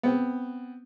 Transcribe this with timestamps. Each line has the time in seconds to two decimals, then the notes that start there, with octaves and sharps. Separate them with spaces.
0.03 B3 C4